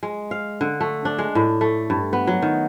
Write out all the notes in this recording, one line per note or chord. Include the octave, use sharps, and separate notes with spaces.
G#3
F5
D3
A3
D4
G#3
A2
A3
G2
B3
F#3
D#3